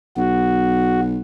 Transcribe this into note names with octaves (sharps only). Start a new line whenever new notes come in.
B1 F#4